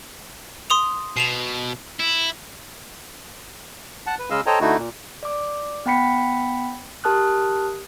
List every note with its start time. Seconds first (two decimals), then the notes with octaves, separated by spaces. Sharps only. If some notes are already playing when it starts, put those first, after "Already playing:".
0.70 C6 D#6 F7
1.17 B2 C7 E7 F7
2.00 E4
4.06 F#5 A5
4.19 B4
4.30 C#3 G#3 D#5 F5 E6
4.46 A4 C5 C#5 D#5 G5 A#5
4.61 D3 A3 D#4 E4 F#4
4.78 A#2
5.23 D5 D6
5.86 B3 F#5 G5 B5 B6 C#7
7.04 G4 A#4 A5 D#6 F6 F#6